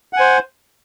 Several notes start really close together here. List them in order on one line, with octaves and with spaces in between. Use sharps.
F#5 G#5 C5